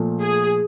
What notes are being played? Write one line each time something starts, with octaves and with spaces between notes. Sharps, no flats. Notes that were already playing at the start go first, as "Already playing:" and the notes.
Already playing: A#2 F3 A3
G#4